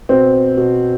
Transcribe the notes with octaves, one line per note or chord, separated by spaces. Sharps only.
B2 C4
B2